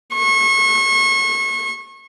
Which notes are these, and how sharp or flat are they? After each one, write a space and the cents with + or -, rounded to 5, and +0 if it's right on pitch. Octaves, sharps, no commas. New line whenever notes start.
C#6 -35